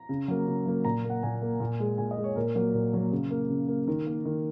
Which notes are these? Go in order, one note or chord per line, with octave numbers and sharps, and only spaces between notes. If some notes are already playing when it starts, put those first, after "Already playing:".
Already playing: A#5
C#3
F#3 A#3
C#3
F#3 A#3
A#2 A#5
A#3
F#5
A#2 G#5
A#3
A#2
G#3
A#2 G#5
D#5
G#3
C#5
A#2 A#4
F#3 A#3
A#2
F#3 A#3
C#3
A#3
C#3
A#3
D#3 A#4
A#3
D#3